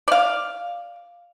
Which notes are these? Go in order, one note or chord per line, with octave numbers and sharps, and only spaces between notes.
D5 F5